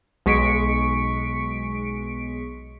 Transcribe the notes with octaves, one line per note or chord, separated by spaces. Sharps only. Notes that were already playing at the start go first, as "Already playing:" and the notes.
B1 G#3 C#6 B6 C#7 D7